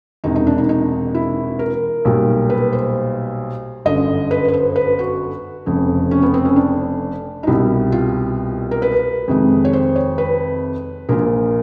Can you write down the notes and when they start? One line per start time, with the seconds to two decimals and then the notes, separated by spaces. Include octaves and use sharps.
0.24 E1 E2 C3 D#4
0.36 D#4
0.47 D4
0.58 D#4
0.69 D#4
1.15 E4
1.59 A#4
2.05 B1 A#2 G3
2.50 B4
2.73 C5
3.85 G1 F#2 D3 D#5
4.31 B4
4.48 B4
4.53 C5
4.76 B4
4.99 F#4
5.66 F1 F2 C#3
6.11 C#4
6.23 B3
6.34 C4
6.45 C#4
6.56 D4
7.43 D#4
7.47 C2 B2 G3 E4
7.92 F4
8.71 A#4
8.82 B4
9.28 F2 C3 D#3 G#3
9.65 C#5
9.73 C5
9.96 C#5
10.18 B4
11.09 A#1 A#2 F3 A#4